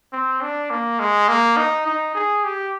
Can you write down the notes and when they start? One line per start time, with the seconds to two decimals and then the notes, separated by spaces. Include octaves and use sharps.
0.13 C4
0.42 D4
0.70 A#3
1.00 G#3
1.29 A#3
1.57 D#4
1.86 D#4
2.15 G#4
2.44 G4